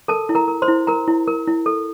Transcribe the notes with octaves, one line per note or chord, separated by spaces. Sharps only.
A4 A#4 A5
E4
A#4 A#5
A#4
C5 C6
E4
A#4 A#5
E4
A#4
E4
A4